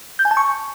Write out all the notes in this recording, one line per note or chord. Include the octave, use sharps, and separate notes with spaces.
G6
G#5
A5
C#6